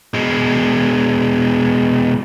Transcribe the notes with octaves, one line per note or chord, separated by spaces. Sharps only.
B2 G#3